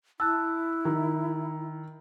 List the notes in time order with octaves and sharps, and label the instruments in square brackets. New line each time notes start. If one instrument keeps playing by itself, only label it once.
[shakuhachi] E4 [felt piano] A5 [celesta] E6 F#6
[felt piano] D#3 [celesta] A#5 E6